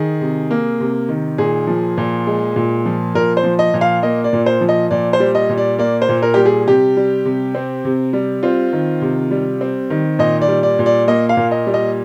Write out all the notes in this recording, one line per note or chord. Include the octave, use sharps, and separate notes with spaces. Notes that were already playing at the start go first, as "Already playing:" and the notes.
Already playing: D#3 G#4
C3
A#3
C3
D#3
A#2 G#4
F3
A#2
G#3
A#2
F3
A#2 A#4
C5
F3
D#5
A#2
F5
A#3 D#5
D5
A#2
C5
F3
D#5
A#2 D5
C5
G3
D#5
A#2
D5
A#3 D5
C5
A#2
A#4
G3 G4
G#4
C3 G4
G3
C3
C4
C3
G3
C4 F4
D#3
C3
G3
C4
D#3
A#2 D#5
D5
G3
D5
A#2
D5
A#3 D#5
F5
A#2
D#5
G3
D#5